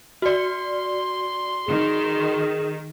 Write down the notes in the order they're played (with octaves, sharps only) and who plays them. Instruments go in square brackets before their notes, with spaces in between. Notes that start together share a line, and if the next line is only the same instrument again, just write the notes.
[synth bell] F#4 D5 [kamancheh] C6
[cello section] D#3 [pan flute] G#4